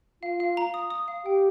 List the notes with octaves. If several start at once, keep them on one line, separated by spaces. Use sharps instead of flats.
F4 F5
F5
A#5
D#6
D#6
F5
G4 G5